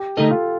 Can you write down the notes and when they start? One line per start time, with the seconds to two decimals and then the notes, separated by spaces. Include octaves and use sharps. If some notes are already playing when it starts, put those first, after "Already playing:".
Already playing: G4
0.17 D3 A3 D#4 A4 A#4 D#5
0.31 F4